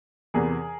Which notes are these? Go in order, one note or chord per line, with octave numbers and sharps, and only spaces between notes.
E2 C3 E3 G#4 A#4